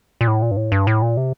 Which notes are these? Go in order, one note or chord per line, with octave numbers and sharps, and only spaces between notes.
A#2
A2
A#2
G2
A2
G2
A2
A#2
C3